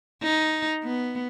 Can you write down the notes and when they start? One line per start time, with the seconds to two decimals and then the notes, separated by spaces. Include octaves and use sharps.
0.23 D#4
0.83 B3